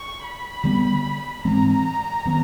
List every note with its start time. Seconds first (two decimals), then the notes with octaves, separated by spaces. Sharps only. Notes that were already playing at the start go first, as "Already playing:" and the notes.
Already playing: C#6
0.23 B5
0.64 D3 G3 B3
1.44 G#2 E3 G#3 C4 A#5
2.25 D#3 F#3 B3